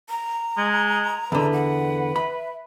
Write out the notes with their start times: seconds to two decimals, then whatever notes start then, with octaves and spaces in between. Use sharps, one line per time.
0.09 A#5
0.58 G#3
1.32 E2 D3 B4
1.53 F#5
2.16 E5 B5